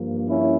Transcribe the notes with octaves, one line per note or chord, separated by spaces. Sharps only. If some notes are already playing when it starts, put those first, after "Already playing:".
Already playing: G2 F3 A#3
C#4 E4